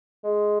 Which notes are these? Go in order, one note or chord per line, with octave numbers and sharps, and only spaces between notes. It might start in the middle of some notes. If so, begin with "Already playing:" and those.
G#3